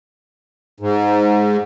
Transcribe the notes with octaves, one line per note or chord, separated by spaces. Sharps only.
G#2